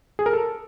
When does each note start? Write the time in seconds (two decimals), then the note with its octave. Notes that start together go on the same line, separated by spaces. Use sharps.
0.19 G#4
0.26 A#4
0.33 A4